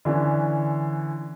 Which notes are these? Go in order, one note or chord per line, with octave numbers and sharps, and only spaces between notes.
D3 E3 C#4 D4